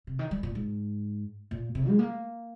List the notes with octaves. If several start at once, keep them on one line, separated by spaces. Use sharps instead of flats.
C3
D#3
G3
A#2
G#2
A#2
C3
G#3
A#3